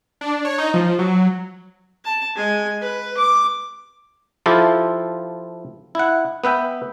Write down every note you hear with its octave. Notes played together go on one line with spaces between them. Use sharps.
D4
C#5
D#4
F3
F#3
A5
G#3 G#5
B4
D6
F3 E4 F4 G4 A4
E4 F#5
B3 B4 E5 G5